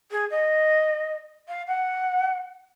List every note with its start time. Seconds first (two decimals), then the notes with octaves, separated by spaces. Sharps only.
0.11 G#4
0.30 D#5
1.48 F5
1.67 F#5